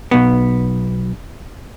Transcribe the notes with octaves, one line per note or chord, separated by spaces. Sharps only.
B1 B3